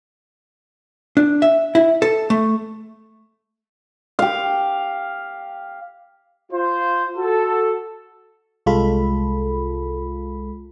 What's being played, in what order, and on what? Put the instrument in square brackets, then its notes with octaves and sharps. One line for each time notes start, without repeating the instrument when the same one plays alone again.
[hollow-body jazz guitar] D4
E5
E4
A4
A3
[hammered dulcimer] G4 F5
[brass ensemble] F4 C5
F#4 A4
[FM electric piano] C2 G#3 F4 A4 B5